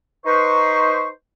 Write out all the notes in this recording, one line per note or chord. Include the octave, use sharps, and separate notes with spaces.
D#4 B4 C5 C#6